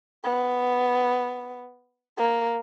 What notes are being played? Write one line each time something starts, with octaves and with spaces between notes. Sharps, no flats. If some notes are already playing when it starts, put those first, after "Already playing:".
B3
A#3